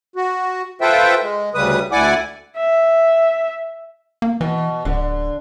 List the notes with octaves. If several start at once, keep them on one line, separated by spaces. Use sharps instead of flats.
F#4
F4 A4 B4 C5 E5 G5
G#3
D2 C#3 G3 B4 D#6
D2 E4 D5 F#5 G#5 D6
E5
A#3
B2 E3
D1 D3